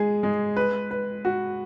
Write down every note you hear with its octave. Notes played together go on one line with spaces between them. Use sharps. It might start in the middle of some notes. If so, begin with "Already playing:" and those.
Already playing: G#3 G#4
G#3
B4
B4
F#4